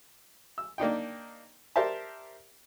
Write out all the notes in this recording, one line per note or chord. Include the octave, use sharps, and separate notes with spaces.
E6
A#3 D4 D#4 G5
G4 A#4 C5 D5 E5 A5